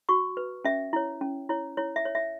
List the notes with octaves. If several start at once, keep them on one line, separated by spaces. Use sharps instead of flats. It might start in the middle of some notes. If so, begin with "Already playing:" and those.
F#4 C#6
B4
C#4 E5
E4 C#5
C#4
E4 C#5
E4 C#5
E5
C#5
E5